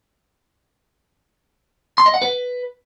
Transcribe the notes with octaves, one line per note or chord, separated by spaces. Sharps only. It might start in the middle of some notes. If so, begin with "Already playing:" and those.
C6
D#5
F#5
B4